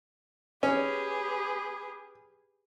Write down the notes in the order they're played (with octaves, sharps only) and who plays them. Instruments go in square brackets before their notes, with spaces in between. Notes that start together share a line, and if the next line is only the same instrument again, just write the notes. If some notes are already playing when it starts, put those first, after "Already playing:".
[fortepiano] C#4 [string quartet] G4 G#4 B4